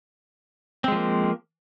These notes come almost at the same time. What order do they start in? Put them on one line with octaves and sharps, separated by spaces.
C4 G#3 F3 A#3